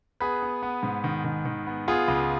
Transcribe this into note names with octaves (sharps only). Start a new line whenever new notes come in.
B3 G#4 B4
B3
B3
G#2
D#3
D#3
D#3
B3
B3 F4 G#4
C#2